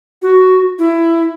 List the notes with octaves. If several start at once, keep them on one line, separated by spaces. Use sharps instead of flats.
F#4
E4